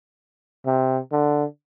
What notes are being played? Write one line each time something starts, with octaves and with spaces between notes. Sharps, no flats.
C3
D3